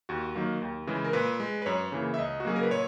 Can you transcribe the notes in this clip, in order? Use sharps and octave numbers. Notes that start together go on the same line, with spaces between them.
D#2 F#4
D#3 F#3 A#3
D#2
C#3 E3 G#3
A#4
A#2 B4
G#3
B4
F#2 C#5
C#3 E3 A#3
E5
C#2 D#5
F#4
C#3 F#3 A#3 G#4
A#4
B4
A#2 C#5